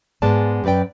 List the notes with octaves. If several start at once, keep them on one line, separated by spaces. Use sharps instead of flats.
G#2 G#3 B3 D5 A5
F#2 G4 B4 D5 G5